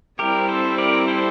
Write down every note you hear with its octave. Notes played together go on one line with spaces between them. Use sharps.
G3 C4 E4 G4 A#4
A4 C5
A#4 D5
A4 C5